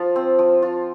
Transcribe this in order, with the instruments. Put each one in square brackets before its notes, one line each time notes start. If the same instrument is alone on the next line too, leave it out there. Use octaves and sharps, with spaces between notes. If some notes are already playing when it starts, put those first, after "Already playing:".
Already playing: [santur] F3 F4
C4
F3
F4